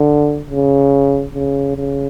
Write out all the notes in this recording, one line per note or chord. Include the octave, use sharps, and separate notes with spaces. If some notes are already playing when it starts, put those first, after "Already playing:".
Already playing: D3
C#3
C#3
C#3